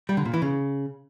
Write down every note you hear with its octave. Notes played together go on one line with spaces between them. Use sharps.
G3
D3
A#2
E3
C#3